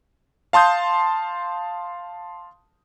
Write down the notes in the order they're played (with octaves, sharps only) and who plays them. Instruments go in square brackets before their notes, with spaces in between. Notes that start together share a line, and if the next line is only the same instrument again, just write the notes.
[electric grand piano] F5 A5 C6 D#6 G6